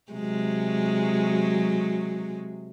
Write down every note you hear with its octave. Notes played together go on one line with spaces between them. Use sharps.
C3 F#3 G#3